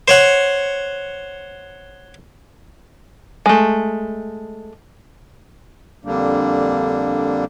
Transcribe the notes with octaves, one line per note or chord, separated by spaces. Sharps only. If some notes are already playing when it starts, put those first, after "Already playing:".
C5 C#5 F#5
G#3 A3
F2 D3 G3 A#3 D4